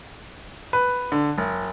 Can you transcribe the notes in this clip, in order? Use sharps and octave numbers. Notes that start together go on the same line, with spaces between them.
B4
D3
F#1